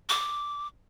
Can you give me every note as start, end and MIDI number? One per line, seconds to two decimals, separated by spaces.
0.09 0.67 86